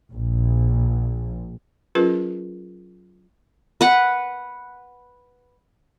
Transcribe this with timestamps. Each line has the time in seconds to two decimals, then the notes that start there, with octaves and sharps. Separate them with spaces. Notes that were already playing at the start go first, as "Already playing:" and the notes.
0.12 A#1
1.95 F#3 C#4 F4 G#4 A#4 B4
3.81 B4 F#5